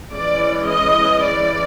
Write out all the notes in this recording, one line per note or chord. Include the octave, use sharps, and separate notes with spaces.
E3 G#3 C#4 D5
D#5
D5